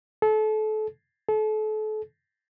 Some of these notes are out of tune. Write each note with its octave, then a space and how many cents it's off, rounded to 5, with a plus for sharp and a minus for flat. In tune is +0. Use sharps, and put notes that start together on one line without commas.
A4 -30
A4 -35